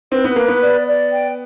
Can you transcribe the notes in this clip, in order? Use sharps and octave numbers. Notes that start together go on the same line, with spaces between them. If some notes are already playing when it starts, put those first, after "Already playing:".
C4 B4
B3
A#3 B4
B3
D5
D5
G5